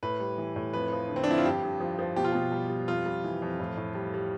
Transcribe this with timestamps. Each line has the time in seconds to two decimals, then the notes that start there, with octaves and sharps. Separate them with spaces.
0.03 A2 B4
0.20 G3
0.38 E3
0.56 A2
0.73 F2 B4
0.92 F3
1.09 D3
1.16 C4
1.24 D4
1.27 F2 E4
1.38 F4
1.45 G2 G4
1.64 G2
1.80 F3
1.99 F3
2.16 B2 G4
2.24 F4
2.33 B2 G4
2.52 G3
2.70 G3
2.88 F2 F4
3.06 G3
3.24 E3
3.42 F2
3.60 A2
3.77 A2
3.95 G3
4.14 G3